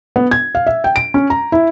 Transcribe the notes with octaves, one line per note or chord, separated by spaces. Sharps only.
B3
G#6
F5
E5
G5
D7
C#4
A#5
E4